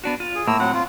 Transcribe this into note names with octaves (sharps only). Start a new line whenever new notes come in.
B3 D4 F#4
F4
G#4
A2 A#3 E6
F#3 C4 F#5
F4